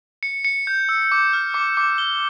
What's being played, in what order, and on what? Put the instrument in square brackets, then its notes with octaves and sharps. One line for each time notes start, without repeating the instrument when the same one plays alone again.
[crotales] C#7
C#7
G6
E6
D6
F6
D6
D6
G7